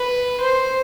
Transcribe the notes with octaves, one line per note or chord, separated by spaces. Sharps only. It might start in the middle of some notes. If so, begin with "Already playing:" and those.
Already playing: B4
C5